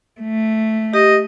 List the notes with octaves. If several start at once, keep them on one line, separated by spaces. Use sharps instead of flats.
A3
G4 D#5